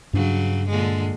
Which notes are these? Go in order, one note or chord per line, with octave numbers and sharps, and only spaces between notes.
G2 C#3 F#3 D4
A#2 D3 G#3